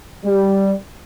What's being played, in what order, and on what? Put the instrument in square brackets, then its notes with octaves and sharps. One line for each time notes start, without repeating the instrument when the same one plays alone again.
[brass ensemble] G3